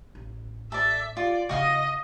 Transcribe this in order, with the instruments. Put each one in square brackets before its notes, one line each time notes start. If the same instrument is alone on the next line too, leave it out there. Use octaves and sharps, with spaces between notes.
[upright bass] A1
[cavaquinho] A4 D5 [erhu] E5
[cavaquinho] F4 [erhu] D5
[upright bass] C#3 E4 [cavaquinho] F#4 F5 D#6 [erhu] D#5